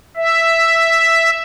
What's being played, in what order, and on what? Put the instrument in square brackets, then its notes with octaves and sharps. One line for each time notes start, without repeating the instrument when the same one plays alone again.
[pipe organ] E5